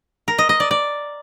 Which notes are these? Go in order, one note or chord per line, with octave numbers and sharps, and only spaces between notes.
A#4
D#5
D#5
D5
D5